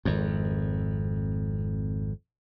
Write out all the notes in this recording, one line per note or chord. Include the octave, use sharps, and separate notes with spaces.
G#1 F2